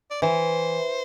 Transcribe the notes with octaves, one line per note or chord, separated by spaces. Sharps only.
D5
E3 C5